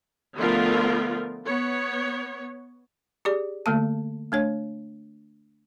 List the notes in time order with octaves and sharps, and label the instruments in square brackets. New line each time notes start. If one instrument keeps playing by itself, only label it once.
[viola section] D3 F3 A3 B3 F4 A#4
B3 C#5
[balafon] G4 G#4 D5
D3 A3 A#3 A5
A3 D4 C#5